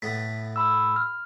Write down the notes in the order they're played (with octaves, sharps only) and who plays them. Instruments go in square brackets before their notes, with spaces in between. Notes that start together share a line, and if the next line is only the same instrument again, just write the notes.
[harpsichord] A2 A3 B3 [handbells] B6
[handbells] B5 E6
F6